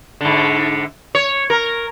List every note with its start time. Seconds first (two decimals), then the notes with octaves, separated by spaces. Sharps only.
0.21 G#2 D3
1.15 C#5
1.50 A#4